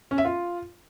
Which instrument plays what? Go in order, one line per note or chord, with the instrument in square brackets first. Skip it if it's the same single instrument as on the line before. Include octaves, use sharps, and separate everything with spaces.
[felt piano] C#4
E5
F4